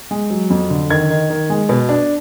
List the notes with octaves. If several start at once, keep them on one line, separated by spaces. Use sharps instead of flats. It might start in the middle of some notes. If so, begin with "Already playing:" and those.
G#3
F#3
F2
D3
D#3 G#6
D#3
D#3
G#3
B2
D4